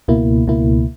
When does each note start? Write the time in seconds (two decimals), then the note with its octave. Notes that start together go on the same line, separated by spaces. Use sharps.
0.08 C#2 B2 A#3 E4
0.47 C#2 B2 A#3 E4